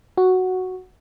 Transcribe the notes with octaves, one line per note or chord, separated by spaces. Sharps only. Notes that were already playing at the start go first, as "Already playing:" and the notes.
F#4